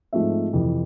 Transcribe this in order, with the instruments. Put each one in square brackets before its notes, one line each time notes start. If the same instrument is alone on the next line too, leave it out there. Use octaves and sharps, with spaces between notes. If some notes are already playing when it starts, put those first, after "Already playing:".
[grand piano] G#2 F3 A3 C4 E5
F2 C3 E3